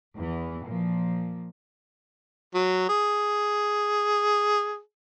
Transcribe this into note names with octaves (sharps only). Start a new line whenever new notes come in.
E2 E3
A#2 F3
F#3
G#4